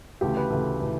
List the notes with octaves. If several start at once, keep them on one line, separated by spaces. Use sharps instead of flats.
D2 C#3 E3 A3 G4
B4
D2 C#3 E3 A3
C#3 E3 A3